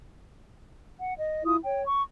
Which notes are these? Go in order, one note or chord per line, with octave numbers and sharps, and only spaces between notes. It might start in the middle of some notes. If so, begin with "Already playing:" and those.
F#5
D#5
E4 F4 D#6
C#5 G5
C#6